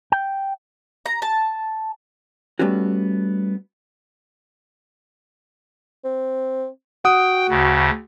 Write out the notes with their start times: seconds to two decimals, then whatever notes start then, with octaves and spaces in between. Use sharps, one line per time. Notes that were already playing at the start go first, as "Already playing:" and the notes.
0.12 G5
1.06 A#5
1.22 A5
2.59 G3 A3 B3 C#4 F#4
6.05 C4
7.05 F#4 F#5 G5 D#6
7.49 D2 C#3